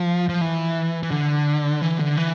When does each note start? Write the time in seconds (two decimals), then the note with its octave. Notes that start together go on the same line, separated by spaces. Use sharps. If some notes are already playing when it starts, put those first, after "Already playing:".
Already playing: F3
0.29 F3
0.41 E3
1.03 E3
1.11 D3
1.82 E3
1.99 D3
2.17 E3